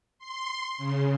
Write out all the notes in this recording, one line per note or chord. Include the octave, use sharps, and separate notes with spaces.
C6
C#3